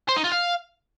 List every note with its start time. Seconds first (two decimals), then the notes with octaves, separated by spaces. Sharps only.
0.09 C5
0.16 D#4
0.24 F4
0.32 F5